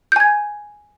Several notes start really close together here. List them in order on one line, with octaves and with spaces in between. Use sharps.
G6 G#5 G#6